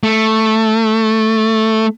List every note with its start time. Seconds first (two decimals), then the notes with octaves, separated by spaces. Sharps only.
0.04 A3